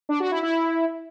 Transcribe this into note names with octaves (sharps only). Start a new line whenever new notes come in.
D4
F#4
E4
E4